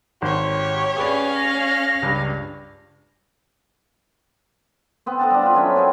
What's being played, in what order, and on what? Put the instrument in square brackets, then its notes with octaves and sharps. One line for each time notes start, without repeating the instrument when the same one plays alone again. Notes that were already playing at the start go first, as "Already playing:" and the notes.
[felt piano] G#1 [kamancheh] G4 C#5 [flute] C6
[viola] C#4 F5 [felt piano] G#4 D5 [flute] B4
[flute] A#6
[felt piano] C#2 G2 G4
[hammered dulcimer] B3 C4
A4 D#5 F#5 A5
G3 D4
F4 B4
F#3 C#4 E5
C4 A#4 C5 G#5